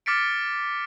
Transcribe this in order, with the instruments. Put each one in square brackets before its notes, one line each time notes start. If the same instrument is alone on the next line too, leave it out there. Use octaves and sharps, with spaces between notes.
[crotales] D6 F6 A6 B6 C#7 D7